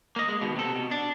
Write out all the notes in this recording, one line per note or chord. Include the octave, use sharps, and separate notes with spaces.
A#3 D#5
G#3
D#2 B2
C3 A4
B2
D4